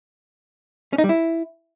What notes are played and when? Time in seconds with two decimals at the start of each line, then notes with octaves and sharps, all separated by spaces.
0.93 C#4
0.98 D#4
1.04 G3
1.09 E4